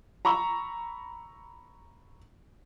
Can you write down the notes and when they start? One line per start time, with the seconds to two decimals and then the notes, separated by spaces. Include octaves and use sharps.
0.25 A#5 B5 C#6 E6